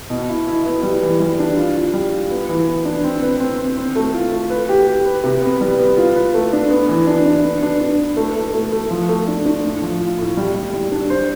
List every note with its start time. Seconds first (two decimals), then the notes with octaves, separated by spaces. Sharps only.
0.10 B2
0.29 E4
0.47 E4
0.65 B3
0.83 G3
1.03 E3
1.20 G3
1.39 D4
1.56 F4
1.75 F4
1.94 G3
2.12 F4
2.30 B3
2.49 E3
2.66 B3
2.85 D4
3.04 C4
3.22 B4
3.40 C4
3.58 C4
3.77 C4
3.96 A3
4.14 F4
4.32 A3
4.50 B4
4.69 G4
4.87 G4
5.06 B4
5.23 C3
5.42 B3
5.61 G3
5.79 B3
5.97 F4
6.16 B4
6.34 A3
6.53 D4
6.70 B3
6.89 E3
7.07 D4
7.25 D4
7.43 B3
7.62 D4
7.80 D4
7.99 B3
8.17 A3
8.35 A3
8.54 A3
8.72 A3
8.91 F3
9.08 A3
9.27 D4
9.45 D4
9.64 A2
9.82 F3
10.00 F4
10.18 A2
10.37 G3
10.55 G3
10.73 G3
10.91 D4
11.10 C5